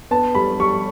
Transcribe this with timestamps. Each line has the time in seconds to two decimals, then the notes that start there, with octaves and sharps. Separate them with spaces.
0.11 B3 A5
0.35 G3 B5
0.60 G3 C#6